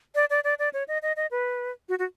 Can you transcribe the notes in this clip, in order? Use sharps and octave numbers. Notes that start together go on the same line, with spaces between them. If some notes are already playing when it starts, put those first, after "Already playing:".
D5
D5
D5
D5
C#5
D#5
D#5
D#5
B4
F#4
F#4